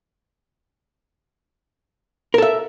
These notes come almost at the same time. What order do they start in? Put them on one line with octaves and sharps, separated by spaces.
A#4 A4 E5